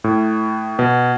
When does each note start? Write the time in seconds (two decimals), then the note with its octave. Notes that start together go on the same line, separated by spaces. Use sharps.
0.04 A2
0.79 B2